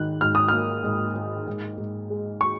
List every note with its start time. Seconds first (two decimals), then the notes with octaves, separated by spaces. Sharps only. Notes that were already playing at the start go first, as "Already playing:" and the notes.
Already playing: G#2 D#3 F#6
0.21 G#2 F6
0.35 D#6
0.48 A#3 F6
0.84 G#2
1.16 A#3
1.47 G#2
1.78 G#2
2.10 G#3
2.41 C#6